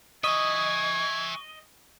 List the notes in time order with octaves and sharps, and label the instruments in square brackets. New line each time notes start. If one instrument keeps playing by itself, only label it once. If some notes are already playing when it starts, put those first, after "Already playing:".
[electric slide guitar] D#5 [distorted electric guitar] E5 G#5 [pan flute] C#6 [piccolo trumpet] G#6